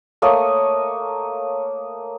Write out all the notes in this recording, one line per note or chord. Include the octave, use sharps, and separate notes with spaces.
A3 A#3 C#5 D#5